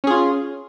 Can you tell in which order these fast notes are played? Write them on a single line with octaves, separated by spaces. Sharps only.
C#4 G#4 F4